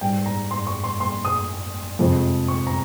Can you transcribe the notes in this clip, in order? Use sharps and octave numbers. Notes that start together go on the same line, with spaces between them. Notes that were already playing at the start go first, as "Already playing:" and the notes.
G#2 G3 G5
A#5
C6
C#6
C6
C6
D#6
F2 C3 F3 G#3
C#6
A#5